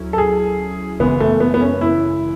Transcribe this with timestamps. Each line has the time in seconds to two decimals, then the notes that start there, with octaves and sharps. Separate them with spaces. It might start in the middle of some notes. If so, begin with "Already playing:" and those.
Already playing: D2 F#3 C#4 E4
0.13 A4
0.18 G#4
0.99 G#1 F#2 C#3 E3 G#3 B3
1.20 A3
1.40 B3
1.54 B3
1.61 C#4
1.81 E4